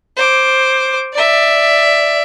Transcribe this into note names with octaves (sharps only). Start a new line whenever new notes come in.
C5 D6
D5 E5